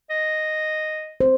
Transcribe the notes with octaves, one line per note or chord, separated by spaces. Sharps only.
D#5
C5